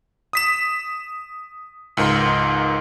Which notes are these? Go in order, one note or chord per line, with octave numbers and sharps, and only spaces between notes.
D#6 B6 E7
C#2 G#2 A#4 A#5 C6